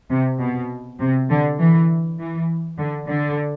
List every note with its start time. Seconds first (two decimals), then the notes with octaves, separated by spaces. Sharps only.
0.10 C3
0.40 B2
1.00 C3
1.30 D3
1.60 E3
2.20 E3
2.79 D3
3.08 D3